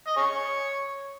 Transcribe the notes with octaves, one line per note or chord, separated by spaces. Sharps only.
D#5
G#4 C#5